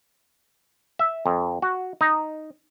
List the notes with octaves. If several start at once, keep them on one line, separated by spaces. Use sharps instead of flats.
E5
F2
F#4
D#4